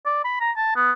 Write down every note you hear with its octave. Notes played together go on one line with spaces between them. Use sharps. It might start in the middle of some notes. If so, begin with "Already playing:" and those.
D5
B5
A#5
A5
B3